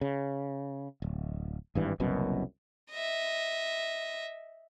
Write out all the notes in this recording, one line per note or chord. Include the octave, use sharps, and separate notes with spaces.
C#3
D1
G#1 G2 E3
F#1 C2 F#2 B2
D#5 E5